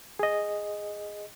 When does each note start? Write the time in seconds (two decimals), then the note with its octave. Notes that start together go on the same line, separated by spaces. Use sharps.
0.19 G#4 D#5